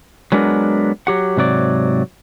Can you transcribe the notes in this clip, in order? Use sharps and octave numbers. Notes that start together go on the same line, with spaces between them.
F#3 G#3 B3 D4 A#4
F#3 G4 F#5
G#2 C3 F#3 D5